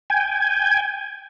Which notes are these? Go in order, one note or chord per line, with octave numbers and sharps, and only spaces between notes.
G5 G#5